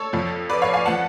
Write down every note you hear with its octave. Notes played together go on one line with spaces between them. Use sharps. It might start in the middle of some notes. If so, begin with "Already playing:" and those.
Already playing: A4 C#5
F2 F3
B4 D5
C#5 F5
F5 G#5
F3 F#5 A5